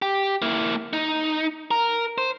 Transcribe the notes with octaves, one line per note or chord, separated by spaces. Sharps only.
G4
A#3 E4
D#4
A#4
C5